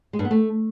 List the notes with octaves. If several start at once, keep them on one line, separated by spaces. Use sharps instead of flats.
G#3
G2
B3
A3